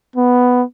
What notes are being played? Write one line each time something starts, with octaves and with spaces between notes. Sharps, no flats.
B3